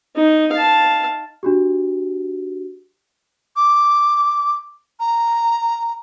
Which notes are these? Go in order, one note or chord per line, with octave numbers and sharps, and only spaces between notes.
D#4
F5 A5
D4 F#4 G4
D6
A#5